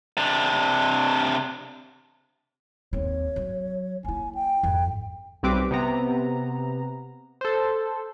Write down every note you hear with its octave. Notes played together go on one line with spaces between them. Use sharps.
C3 D4
D#2 C4 C#5
F#3
A#3 E4 G#5
G5
G#1 F2
B1 G3 C4 G4 B4 D6
C3 B3 A#5
A4 C5